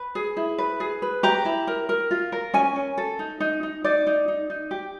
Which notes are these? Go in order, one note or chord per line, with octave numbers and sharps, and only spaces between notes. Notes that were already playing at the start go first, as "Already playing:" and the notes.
Already playing: B4
G#4
E4
B4
G#4
B4
G4 A#5
E4
A#4
A#4
F4
A#4
C#4 G#5
C#4
A4
D#4
D#4
D#4
D#4 D5
D#4
D#4
D#4
G4